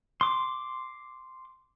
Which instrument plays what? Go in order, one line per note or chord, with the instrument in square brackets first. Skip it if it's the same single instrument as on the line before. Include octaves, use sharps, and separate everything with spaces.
[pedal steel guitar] C6 D6